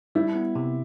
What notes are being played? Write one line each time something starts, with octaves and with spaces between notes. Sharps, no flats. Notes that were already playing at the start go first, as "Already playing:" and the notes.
G3 E4
B3
C3